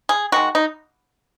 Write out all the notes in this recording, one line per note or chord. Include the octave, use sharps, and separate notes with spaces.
G#4
D#3 G#3 F#4
D#4